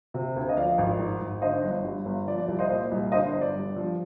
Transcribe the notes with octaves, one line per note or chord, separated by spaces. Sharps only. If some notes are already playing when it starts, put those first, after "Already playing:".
C3
D2
D#5
F3 D5 F5
G#1
G#2
G#1
D3 C5 D#5
G1
G2
G1
F3 D5
D5
C2 D5
C5 D#5
A#2 C5 D#5
C2
D3 C5 D#5
C5
G1
D5
G2
F3